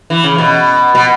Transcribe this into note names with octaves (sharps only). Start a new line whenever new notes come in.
E3
C#3
B2
B2